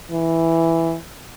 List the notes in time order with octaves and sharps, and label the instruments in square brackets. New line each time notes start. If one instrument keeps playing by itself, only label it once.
[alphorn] E3